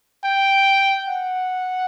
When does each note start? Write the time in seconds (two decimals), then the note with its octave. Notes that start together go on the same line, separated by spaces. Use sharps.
0.24 G5
1.08 F#5